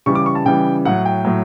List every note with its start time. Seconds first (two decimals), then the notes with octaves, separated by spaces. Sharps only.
0.06 C#3 E3 G3 C#6
0.15 D6
0.26 C#6
0.35 A5
0.45 C#3 E3 G3 G5
0.85 A2 F#3 F#5
1.05 G5
1.25 A2 F#3